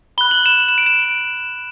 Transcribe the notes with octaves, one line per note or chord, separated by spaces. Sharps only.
B5 F#6 G7
F#7
E7
F#7
E7
D7
E7